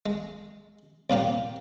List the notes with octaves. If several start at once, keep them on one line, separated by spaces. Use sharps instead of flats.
G#3
C2 A#2 A#3 G4